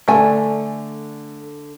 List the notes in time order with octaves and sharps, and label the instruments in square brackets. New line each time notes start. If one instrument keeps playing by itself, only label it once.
[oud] D3 D4 [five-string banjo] A3 G#5